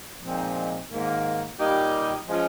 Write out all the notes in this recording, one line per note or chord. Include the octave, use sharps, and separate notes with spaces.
A#2 F3 G#3 C4 D#4
G#2 D#3 A#3
A#2 G3 A#3 D#4 G4
F3 G#3 C#4 F4